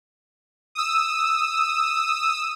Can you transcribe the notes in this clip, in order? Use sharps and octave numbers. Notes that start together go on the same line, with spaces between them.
D#6 E6